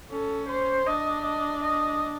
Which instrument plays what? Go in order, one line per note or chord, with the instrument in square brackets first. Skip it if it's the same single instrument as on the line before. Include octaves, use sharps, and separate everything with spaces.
[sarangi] C#4 [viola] A4
[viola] C5
[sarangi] D4 [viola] D#5
[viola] D#5
D#5